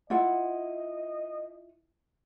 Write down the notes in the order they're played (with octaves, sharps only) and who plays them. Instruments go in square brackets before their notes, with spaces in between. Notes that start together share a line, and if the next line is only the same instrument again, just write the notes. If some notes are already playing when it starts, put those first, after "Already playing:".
[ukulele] E4 F4 F#5 [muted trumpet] D#5